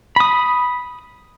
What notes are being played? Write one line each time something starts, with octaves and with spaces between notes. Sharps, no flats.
B5 D#6